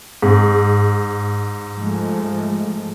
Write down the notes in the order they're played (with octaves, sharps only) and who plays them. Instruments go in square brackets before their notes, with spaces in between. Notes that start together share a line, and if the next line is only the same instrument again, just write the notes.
[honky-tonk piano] G#2
[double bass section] F3 G#3 A3